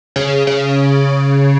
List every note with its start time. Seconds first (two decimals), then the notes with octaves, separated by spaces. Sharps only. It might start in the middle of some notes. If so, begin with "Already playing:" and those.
0.16 C#3
0.47 C#3